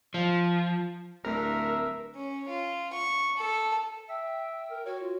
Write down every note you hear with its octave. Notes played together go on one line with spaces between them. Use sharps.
F3
D1 G2 A#4 E5
C#4
F4
C#6
A4
E5 G5
A#4
F#4 C#5
F4